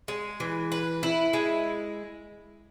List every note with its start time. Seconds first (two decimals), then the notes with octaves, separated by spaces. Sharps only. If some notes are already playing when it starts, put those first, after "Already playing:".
0.08 G#3
0.40 E3
0.72 B4
1.03 E4
1.33 G#3